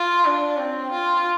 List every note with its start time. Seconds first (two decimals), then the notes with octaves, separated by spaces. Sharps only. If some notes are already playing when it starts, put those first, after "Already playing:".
Already playing: F4
0.25 D4
0.59 C4
0.92 F4